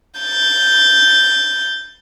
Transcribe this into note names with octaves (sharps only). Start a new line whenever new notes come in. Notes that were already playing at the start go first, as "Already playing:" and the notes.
G6 A6